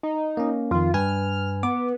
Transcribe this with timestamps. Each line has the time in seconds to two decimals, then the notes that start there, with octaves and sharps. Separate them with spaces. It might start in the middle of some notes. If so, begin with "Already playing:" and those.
0.03 D#4
0.37 A#3 C#4
0.71 F2 D#3 F4
0.94 G2 B4 G#5 F6
1.63 B3 D6